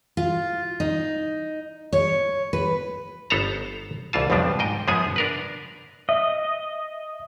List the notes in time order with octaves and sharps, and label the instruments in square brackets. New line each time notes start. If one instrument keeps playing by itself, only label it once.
[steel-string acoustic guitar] F4
D#4
C#5
B4
[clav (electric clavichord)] G1 B3 A4 C5 A5 A#5
C2 E3 F4 A5
B1 F2 B2 F3 G3 D4
G#2 D#5 G5
F#2 F3 G#3 B3 G#4 G#5
D4 A#4 B4
[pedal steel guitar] D#5 [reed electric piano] E5